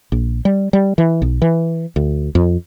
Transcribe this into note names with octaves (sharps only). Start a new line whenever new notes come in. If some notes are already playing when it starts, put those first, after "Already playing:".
A#1
G3
G3
E3
B1
E3
D2
F2